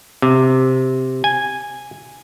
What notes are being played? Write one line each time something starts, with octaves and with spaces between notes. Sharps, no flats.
C3
G#5